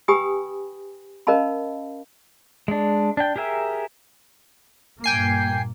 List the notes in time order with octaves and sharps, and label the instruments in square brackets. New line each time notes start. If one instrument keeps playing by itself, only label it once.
[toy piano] G4 B4 G5 G#5 B5 D#6
C#4 A#4 D#5 F5 A5 B5
[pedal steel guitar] G#3 D4
D4 G5
G4 G#4 A#4 E5
[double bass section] G2 A#2 A#3 [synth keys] G5 G#5 C7